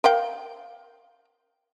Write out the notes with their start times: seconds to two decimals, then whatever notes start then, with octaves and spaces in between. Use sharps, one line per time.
0.04 A#4 F5 G5